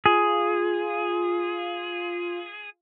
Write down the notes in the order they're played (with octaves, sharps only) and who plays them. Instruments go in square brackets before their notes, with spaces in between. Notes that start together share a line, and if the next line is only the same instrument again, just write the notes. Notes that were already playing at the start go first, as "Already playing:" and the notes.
[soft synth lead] F4 [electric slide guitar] G#4